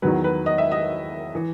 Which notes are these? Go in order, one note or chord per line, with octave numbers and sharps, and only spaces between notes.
E2 D#3 F#3 B4
B4
D#5
E5
D#5
E3